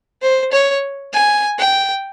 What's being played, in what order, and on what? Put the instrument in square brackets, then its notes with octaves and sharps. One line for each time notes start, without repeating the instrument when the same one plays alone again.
[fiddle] C5
C#5
G#5
G5